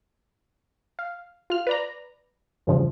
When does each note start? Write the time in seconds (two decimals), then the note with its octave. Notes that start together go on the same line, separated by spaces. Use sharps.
0.99 F5
1.50 F4 F6
1.67 B4 D5 A#5
2.67 E2 G2 C#3 F3